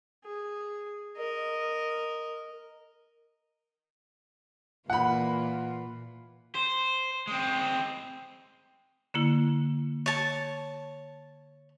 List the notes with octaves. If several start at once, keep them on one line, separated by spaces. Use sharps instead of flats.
G#4
A#4 D#5
A#2 E3 F4 F#5 B5
C5
G#3 C4
D3 A#3 E4
C#5 A5